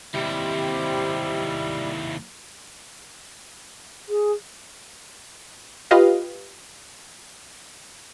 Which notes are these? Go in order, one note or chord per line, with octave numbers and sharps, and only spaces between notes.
D#2 C3 G3 C4 E4 G4
G#4
F4 G4 B4 D#5 F5